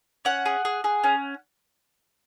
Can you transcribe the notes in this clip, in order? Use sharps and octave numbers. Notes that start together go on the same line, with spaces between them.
C#4 F#5
G#4
G#4
G#4
C#4